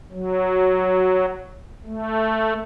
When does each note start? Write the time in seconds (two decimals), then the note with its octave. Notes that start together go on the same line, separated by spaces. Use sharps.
0.12 F#3
1.85 A3